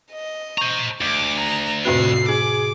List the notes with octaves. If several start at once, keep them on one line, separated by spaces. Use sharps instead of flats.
D#5
C5 A#5 C#6
D2 D6 D7
A#5
F2 A2 C3 F#4 B4 C7
G#4 D6